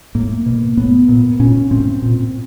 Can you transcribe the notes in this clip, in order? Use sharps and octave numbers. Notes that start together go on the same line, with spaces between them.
A2 A#3
B2
A2 B3
A#2
A#2 C#4
A2 C4
A#2